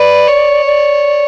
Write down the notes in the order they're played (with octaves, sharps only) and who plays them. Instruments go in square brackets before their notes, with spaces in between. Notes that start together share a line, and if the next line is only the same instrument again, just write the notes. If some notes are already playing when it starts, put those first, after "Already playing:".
Already playing: [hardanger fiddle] B4 [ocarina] D5
[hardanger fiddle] C#5
[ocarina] D5